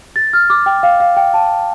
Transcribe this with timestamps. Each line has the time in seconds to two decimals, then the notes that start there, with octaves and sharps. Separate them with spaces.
0.16 A6
0.33 F6
0.50 D6
0.66 G5
0.83 F5
1.00 F5
1.17 G5
1.34 A5